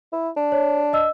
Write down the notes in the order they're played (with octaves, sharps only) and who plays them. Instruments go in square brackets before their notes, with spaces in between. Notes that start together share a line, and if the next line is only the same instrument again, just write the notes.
[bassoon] E4
D4
[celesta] C#5
D#5 E6